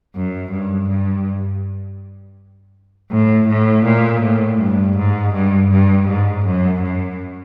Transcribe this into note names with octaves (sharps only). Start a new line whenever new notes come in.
F#2
G2
G2
A2
A2
A#2
A2
G2
G#2
G2
G2
G#2
F#2
F#2